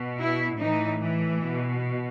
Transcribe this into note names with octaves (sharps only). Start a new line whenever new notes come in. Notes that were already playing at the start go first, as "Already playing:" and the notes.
Already playing: B2
E4
A2 E3 D#4
E3
B2